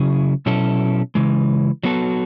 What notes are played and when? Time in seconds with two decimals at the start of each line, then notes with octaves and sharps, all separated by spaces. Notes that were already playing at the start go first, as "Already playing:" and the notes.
Already playing: C#3 F#3 C#4 E4 G#4
0.46 B2 F#3 C#4 E4 A4
1.15 C#3 E3 G#3
1.83 F#3 B3 F#4 A4